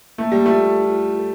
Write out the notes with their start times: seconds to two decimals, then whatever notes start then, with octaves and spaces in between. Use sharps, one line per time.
0.18 A3 A#3
0.32 G3
0.46 A3
0.51 F4 A4
0.85 F4
1.19 A4